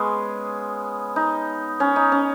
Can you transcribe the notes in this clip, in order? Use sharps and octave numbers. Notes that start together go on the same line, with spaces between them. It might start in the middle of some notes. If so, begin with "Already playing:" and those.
Already playing: G#3 B3 C#4
D#4
C#4
D#4
C#4